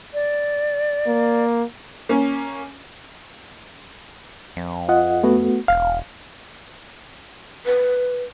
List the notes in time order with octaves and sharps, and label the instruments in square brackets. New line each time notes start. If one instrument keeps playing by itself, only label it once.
[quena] D5
[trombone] A#3
[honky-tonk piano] A#3 C#4
[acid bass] F2
[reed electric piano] F4 D#5 F#5
A3 B3 F#4
[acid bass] E1 [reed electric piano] F5
[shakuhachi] B4